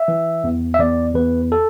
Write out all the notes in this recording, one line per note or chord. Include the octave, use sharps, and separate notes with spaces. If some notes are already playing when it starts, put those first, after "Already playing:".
Already playing: E5
E3
E2
E5
E2 D5
E2 B4
A4